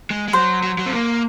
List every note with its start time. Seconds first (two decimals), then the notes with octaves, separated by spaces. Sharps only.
0.10 G#3
0.28 G#3
0.33 F#3 C5
0.63 F#3
0.78 F#3
0.86 C4
0.93 A#3